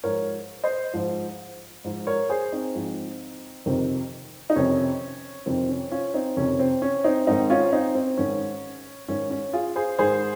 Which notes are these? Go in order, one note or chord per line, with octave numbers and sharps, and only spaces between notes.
G#2 F3 A#4 C#5
C5 D#5
G#2 F3
G#2 F3
A#4 C#5
G#4 C5
C4 D#4
G#2 F3
F2 C3 D#3
D#4
F2 C3 D#3 C#4
F2 C3 D#3 C4
C#4
C#4 F4
C4 D#4
F2 C3 D#3 C#4
C4
C#4
C4 D#4
G#2 D#3 C4 D#4
C#4 F4
C4 D#4
C4
G#2 D#3 C#4
G#2 D#3 C#4
C#4
F4 G#4
G#4 C5
G#2 D#3 G#4 C5